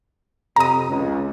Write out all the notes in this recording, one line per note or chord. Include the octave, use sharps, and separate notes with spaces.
F2 C3 A#5 D#6
C#2